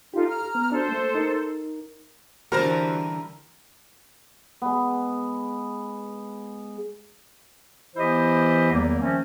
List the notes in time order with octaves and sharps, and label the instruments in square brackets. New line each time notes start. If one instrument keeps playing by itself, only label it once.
[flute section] D#4 F4 [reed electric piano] G4 A4
[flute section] A#5 F6
[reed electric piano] B3
[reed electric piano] D4 F#4 [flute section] A4 C5
[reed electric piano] A3 A#3
D#4 A#4
[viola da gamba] D3 E3 [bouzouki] G3 A5 A#5 [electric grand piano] F#4 C5 [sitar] A#4
[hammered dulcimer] G#3 B3
[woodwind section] E3 B3 E4 G4 C5 D#5
E2 D#3 F#3 G3 A#3
D#3 F3 A3 C4 C#4